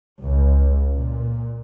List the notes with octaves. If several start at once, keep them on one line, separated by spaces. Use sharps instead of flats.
C#2
A#2